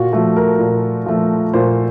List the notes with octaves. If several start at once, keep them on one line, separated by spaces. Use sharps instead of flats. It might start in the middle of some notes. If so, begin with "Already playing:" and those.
Already playing: A#2 F4 F#4
F3 A3 F#4
A#4
A#2
F3 A3
A#2 C5